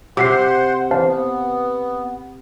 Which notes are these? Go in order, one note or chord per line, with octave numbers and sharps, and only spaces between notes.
C3 C5 F#5 C6 D6 B6 C7
E3 C5 F5 A5
B3